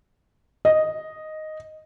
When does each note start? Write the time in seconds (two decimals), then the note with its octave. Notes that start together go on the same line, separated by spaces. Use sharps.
0.65 D#5